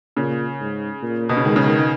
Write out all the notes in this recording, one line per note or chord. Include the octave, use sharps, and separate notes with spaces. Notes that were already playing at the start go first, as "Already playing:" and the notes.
A#2 C#3
G#2
A#2
B2
C#3
D#3 G#3
C#3
D#3
D#3